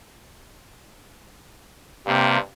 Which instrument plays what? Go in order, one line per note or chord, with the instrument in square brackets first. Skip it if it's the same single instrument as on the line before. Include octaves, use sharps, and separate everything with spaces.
[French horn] G2 [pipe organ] C3 A#3 C4